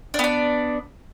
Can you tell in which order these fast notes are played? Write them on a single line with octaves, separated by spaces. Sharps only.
D4 B3 D5